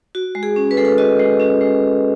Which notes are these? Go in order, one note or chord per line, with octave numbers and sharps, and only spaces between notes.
F#4
G#3
G#4
C#4
B4
G#3 A4
B4
F#4 D#5
G#3
C#4
G#3